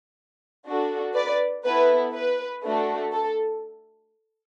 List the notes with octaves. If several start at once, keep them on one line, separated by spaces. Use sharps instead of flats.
D4 F#4 A4
B4 D5
B3 E4 A4 B4
B4
A3 D4 F#4 A4
A4